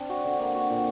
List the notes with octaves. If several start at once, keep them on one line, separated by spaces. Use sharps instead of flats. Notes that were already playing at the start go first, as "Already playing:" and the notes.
Already playing: C4 D4
F#4
D3
A#3
F#4
A#2